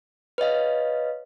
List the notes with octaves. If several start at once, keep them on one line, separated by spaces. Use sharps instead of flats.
B4 C#5 D#5 F5